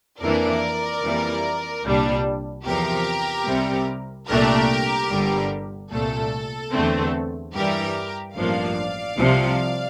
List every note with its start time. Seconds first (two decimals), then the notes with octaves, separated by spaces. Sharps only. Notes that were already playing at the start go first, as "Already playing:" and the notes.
0.20 F2 E3 A#3 D4 A#4 D5
1.02 F2 E3 G3 A#3
1.83 C2 A#2 G3 D4
2.65 E2 C3 F3 G4 A#4
3.47 C2 C3 G3 C4
4.28 C2 A#2 A3 D4 G4 A#4
5.10 G1 G2 D3 G3
5.92 C2 A#2 A3 A4
6.72 E2 D3 A3 C4
7.54 G2 E3 G3 G4 A#4
8.35 A1 G2 F3 A#3 D4 D5 F5
9.17 C2 C3 F3